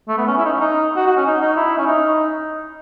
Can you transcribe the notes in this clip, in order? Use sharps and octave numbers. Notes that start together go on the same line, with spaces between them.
A3
B3
C#4
E4
D#4
C#4
D#4
F#4
F#4
C#4
D#4
D#4
E4
C#4
D#4